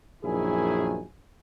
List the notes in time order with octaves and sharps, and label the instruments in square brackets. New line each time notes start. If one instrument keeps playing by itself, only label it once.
[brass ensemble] A#1 F#2 D#3 E4 G#4 G#5